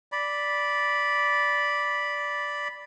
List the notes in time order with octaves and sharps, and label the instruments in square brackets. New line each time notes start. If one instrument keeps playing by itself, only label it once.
[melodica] D5 B5